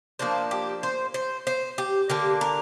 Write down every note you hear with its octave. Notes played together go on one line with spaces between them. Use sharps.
F3 A#3 D4 C5
G4
C5
C5
C5
G4
D3 A#3 D4 G4
A#4